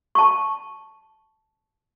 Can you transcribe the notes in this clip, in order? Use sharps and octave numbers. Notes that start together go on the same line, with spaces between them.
A5 C#6